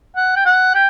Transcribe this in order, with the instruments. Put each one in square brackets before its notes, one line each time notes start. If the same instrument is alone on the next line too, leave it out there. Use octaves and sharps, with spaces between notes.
[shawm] F#5
G5
F#5
G5